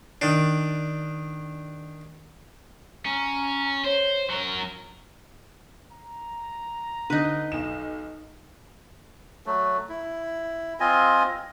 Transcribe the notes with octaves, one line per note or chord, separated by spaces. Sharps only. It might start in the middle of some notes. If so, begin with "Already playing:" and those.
D#3 D4
C#4 A#5
C5 C#5
F#3 A#4 A#5
A#5
D3 D#4 B4
B1 E7
F#3 A3
E4
C4 F4 D#5 G#5